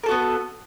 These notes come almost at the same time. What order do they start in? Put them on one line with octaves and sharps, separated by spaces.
A#4 A4 F#4 B3